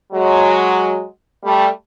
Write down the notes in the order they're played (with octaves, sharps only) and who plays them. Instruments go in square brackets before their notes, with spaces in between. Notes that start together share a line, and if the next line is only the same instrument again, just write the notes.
[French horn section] F#3 G#3
G3 A3